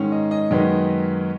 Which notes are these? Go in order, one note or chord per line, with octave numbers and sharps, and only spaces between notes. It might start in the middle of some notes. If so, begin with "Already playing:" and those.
Already playing: G#2 D#3 G#3 C#4
D#5
D#5
F#2 D#3 G#3 B3